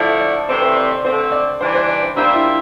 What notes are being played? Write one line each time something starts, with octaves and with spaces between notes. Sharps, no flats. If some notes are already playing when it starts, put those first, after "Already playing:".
Already playing: D3 F3 A3 E4 A4 D5
D5
C3 E3 A3 C4 C5
C5
D5
D5
D3 A3 C4 C5
D5
E3 G3 D4 C5
C5
D5
C5
G3 A#3 D4 F4 C5 E5
E4